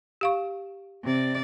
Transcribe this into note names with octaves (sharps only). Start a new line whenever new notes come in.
G4 F5 C#6
C3 D5